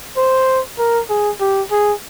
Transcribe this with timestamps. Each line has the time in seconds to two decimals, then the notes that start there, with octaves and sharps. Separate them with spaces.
0.17 C5
0.79 A#4
1.10 G#4
1.40 G4
1.71 G#4